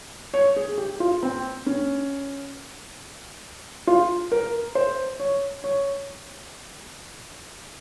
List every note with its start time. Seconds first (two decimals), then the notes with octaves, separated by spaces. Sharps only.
0.34 C#5
0.56 G#4
0.78 G4
1.00 F4
1.23 C4
1.66 C#4
3.87 F4
4.32 A#4
4.75 C5
5.20 C#5
5.64 C#5